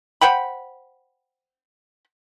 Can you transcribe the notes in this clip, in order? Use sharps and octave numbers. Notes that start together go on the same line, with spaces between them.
C5 F#5 G5 B5